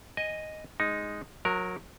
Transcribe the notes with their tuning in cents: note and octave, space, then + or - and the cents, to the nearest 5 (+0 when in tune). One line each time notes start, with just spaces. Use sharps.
D#5 +0 G#5 -15
G#3 +0 D#4 +0
F#3 -25 A#4 +0